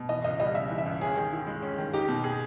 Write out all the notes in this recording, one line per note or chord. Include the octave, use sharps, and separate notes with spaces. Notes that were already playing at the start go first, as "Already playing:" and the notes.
Already playing: B2
E3 D#5
C#2 D#5
G3 D#5
C#3 E5
E3
E5
C#2
C#4 G#4
D#3
E4
G#3
C#4
D#3
D#4 G4
B2
G#4